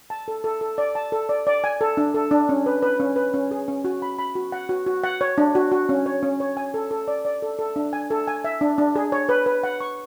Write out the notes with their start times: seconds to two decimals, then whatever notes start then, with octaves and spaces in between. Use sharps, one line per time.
0.10 A5
0.28 A4
0.44 A4
0.61 A4
0.78 D5
0.95 A5
1.12 A4
1.29 D5
1.47 D5
1.64 G#5
1.81 A4
1.97 D4
2.14 A4
2.31 D4
2.49 C#4
2.66 B4
2.83 B4
3.00 C#4
3.16 B4
3.34 C#4
3.51 G#4
3.68 C#4
3.85 F#4
4.02 B5
4.19 B5
4.35 F#4
4.52 F#5
4.69 F#4
4.86 F#4
5.04 F#5
5.21 C#5
5.38 D4
5.55 F#4
5.72 F#4
5.89 C#4
6.06 C#5
6.23 C#4
6.40 C#5
6.57 G#5
6.74 A4
6.91 A4
7.08 D5
7.25 D5
7.42 A4
7.59 A4
7.76 D4
7.93 G#5
8.10 A4
8.27 G#5
8.44 E5
8.61 D4
8.78 D4
8.96 G#4
9.12 C#5
9.29 B4
9.46 B4
9.63 F#5
9.81 C#6